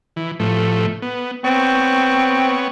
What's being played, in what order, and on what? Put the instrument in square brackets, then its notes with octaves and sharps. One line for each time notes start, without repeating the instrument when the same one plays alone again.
[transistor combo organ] E3
A2 F3 A3
B3
[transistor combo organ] B3 C#5 [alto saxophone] C4